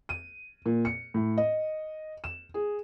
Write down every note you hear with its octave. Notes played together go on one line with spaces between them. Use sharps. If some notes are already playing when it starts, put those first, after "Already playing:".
D#7
A#2
C#7
A2
D#5
E7
G#4